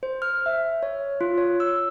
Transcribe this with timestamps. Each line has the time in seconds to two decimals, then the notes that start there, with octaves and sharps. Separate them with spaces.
0.03 C5
0.22 F6
0.46 E5
0.83 C#5
1.21 F4
1.38 C#5
1.60 E6